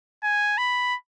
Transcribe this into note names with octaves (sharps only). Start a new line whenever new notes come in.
G#5
B5